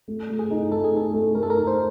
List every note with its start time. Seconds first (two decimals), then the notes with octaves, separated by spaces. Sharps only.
0.08 A3
0.29 A3
0.39 G#4
0.51 D#4
0.72 A3 A4
0.84 G#4
0.93 D#4 A4
1.13 A3
1.35 A3 A#4
1.43 A4
1.50 A#4
1.56 D#4
1.67 C5